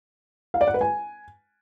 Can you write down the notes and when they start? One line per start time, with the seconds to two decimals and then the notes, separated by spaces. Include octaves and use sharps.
0.54 F5
0.61 D5
0.67 F#5
0.74 B4
0.81 G#5